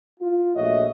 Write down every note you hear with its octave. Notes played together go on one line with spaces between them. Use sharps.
F4
A#1 A3 F#4 C#5 D#5 E5